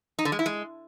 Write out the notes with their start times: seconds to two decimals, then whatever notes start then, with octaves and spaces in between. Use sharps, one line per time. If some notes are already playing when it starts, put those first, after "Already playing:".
0.19 D#4
0.25 D3
0.32 G#3
0.39 E4
0.46 G#3